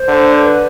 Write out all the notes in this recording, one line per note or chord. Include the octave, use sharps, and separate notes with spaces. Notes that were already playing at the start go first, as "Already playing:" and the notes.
Already playing: C5
D3
C5
B4